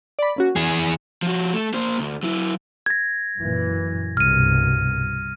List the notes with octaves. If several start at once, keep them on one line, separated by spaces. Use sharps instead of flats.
D5 B5
A#3 C#4 F#4
E3 G#4 G#5
F3 F#4
A3
A#3 C5
D2
F#3 E4
G#6 A#6
F#2 A#2 E3
C2 G2 B2 F6 D#7